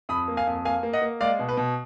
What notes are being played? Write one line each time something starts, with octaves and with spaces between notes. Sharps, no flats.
F2 B5 D#6
A#3
F5 G#5
F2
A#3 F5 G#5
A#3
D#5 F#5
A#3
G#3 D5 F5
B2
B4
B2